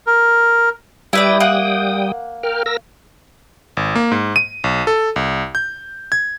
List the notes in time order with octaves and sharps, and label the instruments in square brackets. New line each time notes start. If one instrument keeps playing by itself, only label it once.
[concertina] A#4
[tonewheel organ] G3 G5 D#6 [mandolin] E4 B4 D5
[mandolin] A#3 F#5
[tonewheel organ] A#4 G5 F6
A#4 E6 A#6
[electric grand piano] G#1
A#3
G#2
D#7
B1
A4
C2
G6
G#6